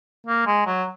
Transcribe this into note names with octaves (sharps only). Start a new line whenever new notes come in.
A#3
G#3
F#3